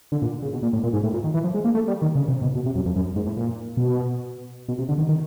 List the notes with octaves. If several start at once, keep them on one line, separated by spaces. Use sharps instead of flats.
D3
A#2
C#3
B2
A#2
A2
A#2
G#2
A2
A#2
D#3
E3
F3
G#3
A#3
A3
G3
D#3
C#3
C3
B2
B2
C3
F#2
F2
F#2
G#2
A2
A#2
B2
B2
C3
D3
D#3
D#3